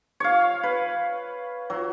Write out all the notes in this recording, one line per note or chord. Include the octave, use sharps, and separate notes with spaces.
C#5 F5
B4
F#3